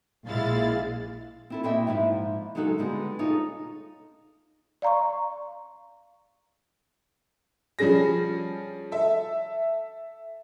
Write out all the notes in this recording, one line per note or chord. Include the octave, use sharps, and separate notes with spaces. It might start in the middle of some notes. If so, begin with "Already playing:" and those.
A#1 A#2 G#3 E4 F5 A6
C4 E4 A4
A#2 C4 E4 D#5 E5 G5
G#2 F3 E4
C#3 F#3 G#3 D#4 F#4 A4
D3 G3 G#3 B3
D#4 F4 G#4 A4 C#5
D5 F5 A#5 C6 C#6
F3 G3 C#4 G#4 A#6
A4 E5